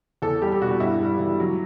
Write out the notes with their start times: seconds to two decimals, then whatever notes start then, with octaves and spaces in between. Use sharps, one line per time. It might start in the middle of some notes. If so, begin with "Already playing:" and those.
0.22 E2 A4
0.42 G3 G4
0.52 G4
0.61 B2 F#4
0.80 G2 E4
1.00 G3
1.19 E3
1.40 F#3